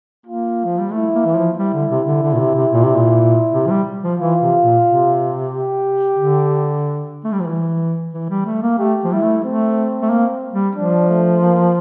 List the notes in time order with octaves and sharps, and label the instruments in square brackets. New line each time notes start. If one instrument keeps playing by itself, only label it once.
[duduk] A#3 [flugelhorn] F4
[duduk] F3
G3
[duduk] A3 [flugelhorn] E4
[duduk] A#3
E3
F3
[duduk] G3 [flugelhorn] E4
[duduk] D3
C3
D3
D3
A#2
C3
C3
A#2
C3
A#2
C3
F3
G3
F3
[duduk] E3 [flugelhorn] F4
[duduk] C3
A#2
C3
[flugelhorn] G4
[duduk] D3
A3
G3
F3
E3
E3
G3
A3
A#3
[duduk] A3 [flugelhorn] G4
[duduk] F3
[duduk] G3 [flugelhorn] E4
[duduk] A3
[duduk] A3 [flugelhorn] C4
[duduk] A3
A#3
G3
[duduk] F3 [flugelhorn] D4
[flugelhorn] A3
A#3